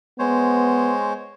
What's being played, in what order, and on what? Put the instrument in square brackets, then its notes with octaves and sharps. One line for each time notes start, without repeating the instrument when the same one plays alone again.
[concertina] G#3 C5 C#5 [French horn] B3